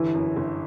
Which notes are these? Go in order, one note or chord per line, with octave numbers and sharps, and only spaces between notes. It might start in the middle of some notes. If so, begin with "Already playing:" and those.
Already playing: G1 E3
F#2
G1